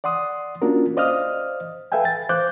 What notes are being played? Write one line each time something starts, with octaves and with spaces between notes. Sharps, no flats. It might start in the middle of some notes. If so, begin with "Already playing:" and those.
D5 F#5 C6 D#6
A#3 C#4 D4 F4 F#4 A#4
C5 D5 D#5 F5 D#6 F6
A4 B4 E5 F5 G5 G#5
A6
C5 F5 D6 F#6 G6